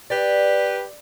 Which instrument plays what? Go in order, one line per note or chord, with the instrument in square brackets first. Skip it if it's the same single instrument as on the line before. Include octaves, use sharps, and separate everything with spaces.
[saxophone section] G4 B4 [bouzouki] D5